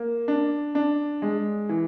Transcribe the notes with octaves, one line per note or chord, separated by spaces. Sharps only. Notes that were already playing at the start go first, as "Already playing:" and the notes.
Already playing: A#3
D4
D4
G#3
E3